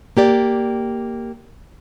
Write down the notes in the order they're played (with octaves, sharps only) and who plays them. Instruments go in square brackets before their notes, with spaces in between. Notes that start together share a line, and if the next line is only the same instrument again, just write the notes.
[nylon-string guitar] A#3 G4 D5